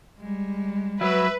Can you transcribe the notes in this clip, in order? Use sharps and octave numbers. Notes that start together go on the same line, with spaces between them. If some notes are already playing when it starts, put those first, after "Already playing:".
G3 G#3
F#3 B4 E5